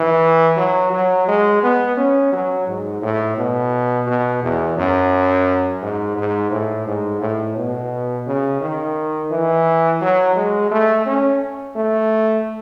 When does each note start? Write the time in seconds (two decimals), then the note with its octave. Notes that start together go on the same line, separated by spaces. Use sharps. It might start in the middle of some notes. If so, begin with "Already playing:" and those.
Already playing: E3
0.57 F#3
0.93 F#3
1.28 G#3
1.63 B3
1.97 C#4
2.32 F#3
2.68 G#2
3.02 A2
3.37 B2
4.07 B2
4.43 E2
4.77 F#2
5.82 G#2
6.17 G#2
6.51 A2
6.87 G#2
7.21 A2
7.56 B2
8.26 C#3
8.61 D#3
9.31 E3
10.01 F#3
10.36 G#3
10.71 A3
11.06 C#4
11.76 A3